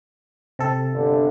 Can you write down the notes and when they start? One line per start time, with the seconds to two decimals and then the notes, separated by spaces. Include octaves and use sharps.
0.59 C3 A4
0.93 G1 D3